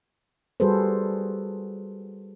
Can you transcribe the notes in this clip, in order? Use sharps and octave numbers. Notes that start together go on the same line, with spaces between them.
G3 F#4 G#4 A4 B4 C5